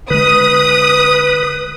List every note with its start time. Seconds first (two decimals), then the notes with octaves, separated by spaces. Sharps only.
0.10 D3 G#3 B4 D#6